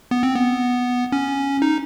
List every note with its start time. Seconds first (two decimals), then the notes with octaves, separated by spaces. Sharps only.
0.11 B3
0.23 C4
0.35 B3
1.12 C#4
1.62 D#4